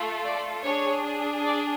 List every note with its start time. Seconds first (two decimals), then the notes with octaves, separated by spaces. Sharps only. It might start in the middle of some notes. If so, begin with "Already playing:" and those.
Already playing: A3 F4 A4
0.25 D5
0.64 D4 G#4 C#5
1.46 D5